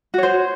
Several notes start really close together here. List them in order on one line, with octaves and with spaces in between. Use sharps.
F#4 C#5 C5